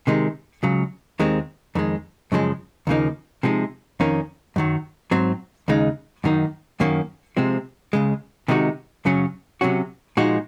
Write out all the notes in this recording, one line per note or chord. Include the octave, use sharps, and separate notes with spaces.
C3 D#3 G#3
C#2 C#3 F#3
D#2 D#3 G#3 C4
F2 D#3 G#3
F#2 C#3 F3 G#3
D#2 C#3 F3 A#3 D#4
C3 F3 G#3 D#4
F2 D#3 A#3 C#4
F#2 D#3 F#3
G#2 F#3 C4
D#2 C#3 G#3 D#4
F#2 D#3 A#3 D#4
F#2 D#3 A#3 C#4
C3 F3 G#3 C4
C#2 C#3 G#3
C3 D#3 G#3 D#4 F#4
F#2 C#3 F#3 C#4
C3 F#3 C#4 F#4
A#2 F3 G#3 D#4 F#4